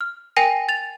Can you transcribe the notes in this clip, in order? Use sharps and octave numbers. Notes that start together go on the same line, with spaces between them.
F6
A#4 G5 G#5 A#6 D#7
A6 F7